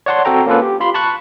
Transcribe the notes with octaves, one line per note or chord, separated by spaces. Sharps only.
C#5 D5 F#5 A5 C6
C4 F#4 A4 G5 A#5
A#3 C#4 F4 A4 B4
G4
F4 B5 C6
A5 B5 C#6 F#6